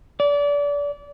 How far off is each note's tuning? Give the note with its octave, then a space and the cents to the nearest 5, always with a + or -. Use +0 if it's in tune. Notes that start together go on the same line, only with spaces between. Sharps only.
D5 -30